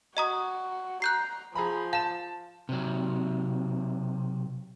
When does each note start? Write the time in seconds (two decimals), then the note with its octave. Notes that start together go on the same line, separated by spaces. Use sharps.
0.17 F#4 D#5 A#5 D#6
1.02 A#5 F#6 G6 C7
1.55 F3 G#4 A#5 B5
1.93 F5 A5 E7
2.69 C3 F#3